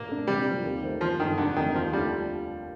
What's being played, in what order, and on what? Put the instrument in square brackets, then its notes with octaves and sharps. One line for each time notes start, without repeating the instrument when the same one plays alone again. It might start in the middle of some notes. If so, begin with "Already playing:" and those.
Already playing: [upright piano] A#2 [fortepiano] A#3
[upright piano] A3 D4 A4
[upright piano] C3 [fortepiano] G3
[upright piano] F3 A#3
D#2
D#3 A3 C4
[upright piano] G1 [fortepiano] F3
[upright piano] G2 D3 [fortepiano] D#3
[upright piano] F1 [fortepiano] D3
[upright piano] F2 D3 A3 D#4 [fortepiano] D#3
[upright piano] D#2 [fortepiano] F3
[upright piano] D3 A3 D4 F4 [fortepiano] G3